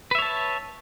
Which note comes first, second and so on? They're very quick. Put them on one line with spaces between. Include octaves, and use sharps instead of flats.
B4 E5 C#5 A5